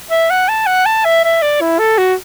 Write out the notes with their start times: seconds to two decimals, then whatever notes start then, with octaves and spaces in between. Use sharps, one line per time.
0.10 E5
0.30 F#5
0.49 A5
0.66 F#5
0.86 A5
1.05 E5
1.24 E5
1.42 D5
1.61 E4
1.79 A4
1.98 F#4